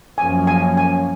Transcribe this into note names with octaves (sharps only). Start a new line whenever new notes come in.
F#2 F3 A#3 C#4 G#5
G#5
G#5